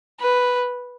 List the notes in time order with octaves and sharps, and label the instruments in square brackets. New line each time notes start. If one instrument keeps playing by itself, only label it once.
[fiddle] B4